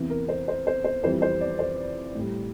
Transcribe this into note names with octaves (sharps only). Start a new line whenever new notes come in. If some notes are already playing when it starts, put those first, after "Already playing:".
Already playing: E2 C3 E3
A#4
C5
C5
C5
C5
F2 E3 G3 C5
C5
D5
C5
A2 G3